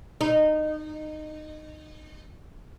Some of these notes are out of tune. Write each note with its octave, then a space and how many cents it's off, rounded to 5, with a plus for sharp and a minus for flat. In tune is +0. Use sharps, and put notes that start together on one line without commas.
D#4 -20